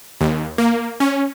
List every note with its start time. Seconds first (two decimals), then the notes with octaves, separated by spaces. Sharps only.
0.21 D#2
0.58 A#3
1.00 C#4